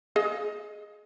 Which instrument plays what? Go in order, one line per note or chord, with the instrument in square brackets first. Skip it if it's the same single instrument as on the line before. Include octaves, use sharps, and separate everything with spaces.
[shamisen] G#4 D#5 F5